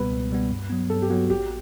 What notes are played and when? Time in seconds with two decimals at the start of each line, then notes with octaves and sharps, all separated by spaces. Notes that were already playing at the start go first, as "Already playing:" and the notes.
Already playing: C#2 B2 G3 B3 B4
0.10 C#2
0.30 B2 G3 B3
0.50 G2
0.70 F#3 B3
0.90 G2 A4
1.02 G4
1.10 F#3 B3 F#4
1.30 A1 G4